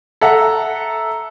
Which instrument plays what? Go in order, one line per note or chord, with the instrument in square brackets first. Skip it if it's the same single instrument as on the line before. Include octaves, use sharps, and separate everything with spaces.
[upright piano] A4 E5 F#5 A#5